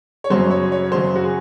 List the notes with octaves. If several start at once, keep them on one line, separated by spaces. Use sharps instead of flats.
C#5
F#2 C#3 F#3 C5
C#5
C#5
F#2 C#3 F#3 C5
F#4
G#4